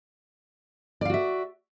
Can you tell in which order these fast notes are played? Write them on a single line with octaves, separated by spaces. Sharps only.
D5 F5 F#4 E5